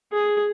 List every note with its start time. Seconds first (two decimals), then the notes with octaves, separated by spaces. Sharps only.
0.12 G#4